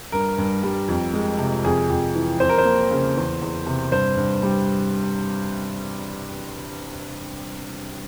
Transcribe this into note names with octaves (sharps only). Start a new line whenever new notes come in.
G2 A#4
G2
G3
F2
G#3
C3
F2 G#4
F2
E3
F2 C5
A#4
C5
A#3
C#3
E2
E2
C3
G2 C5
G2
G3